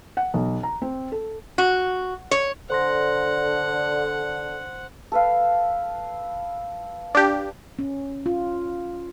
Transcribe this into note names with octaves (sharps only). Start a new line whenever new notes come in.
F#5
B1
A#5
C4
A4
F#4
C#5
D3 C5 F#5 C6 A#6
A4 B4 F5
D4 G4
C#4
F4